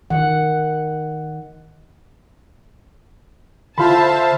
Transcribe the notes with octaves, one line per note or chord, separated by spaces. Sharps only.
D#3 F#5
D3 F4 C5 E5 F5 A5 B5